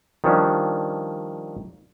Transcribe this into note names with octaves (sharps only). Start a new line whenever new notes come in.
D#3 F3 G3 C#4 D4